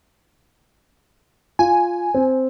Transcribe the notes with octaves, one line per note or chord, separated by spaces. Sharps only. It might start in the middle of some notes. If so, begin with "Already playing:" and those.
F4 G#5
C4